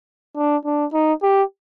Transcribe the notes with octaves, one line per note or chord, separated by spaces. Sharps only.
D4
D4
D#4
G4